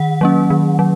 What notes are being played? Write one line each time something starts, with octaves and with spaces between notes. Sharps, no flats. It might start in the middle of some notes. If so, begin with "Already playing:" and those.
Already playing: D#3 F#5
F#3 A#3 C#4
D#3
F#3